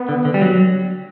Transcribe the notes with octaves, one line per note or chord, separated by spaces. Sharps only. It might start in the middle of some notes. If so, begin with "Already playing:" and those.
Already playing: B3
D3
D3
G3
F#3